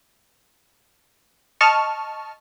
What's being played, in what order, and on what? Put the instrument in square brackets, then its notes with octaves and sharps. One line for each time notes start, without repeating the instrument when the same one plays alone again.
[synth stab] D#5 A5 C#6 F6